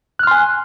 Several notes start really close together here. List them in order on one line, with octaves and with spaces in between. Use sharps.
F#6 F6 C6 G#5